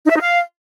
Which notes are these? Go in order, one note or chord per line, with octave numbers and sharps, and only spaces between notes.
D#4
E5
D#4
F5